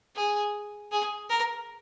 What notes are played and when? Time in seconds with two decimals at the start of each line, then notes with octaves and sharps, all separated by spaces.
0.16 G#4
0.92 G#4
1.30 A#4